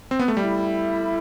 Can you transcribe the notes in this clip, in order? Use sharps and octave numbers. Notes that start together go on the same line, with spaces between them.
C4
B3
A3
G3 E4 A4 E5 B5